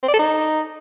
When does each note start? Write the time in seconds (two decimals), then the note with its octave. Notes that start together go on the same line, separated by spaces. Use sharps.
0.03 C4
0.08 D5
0.14 A4
0.19 D#4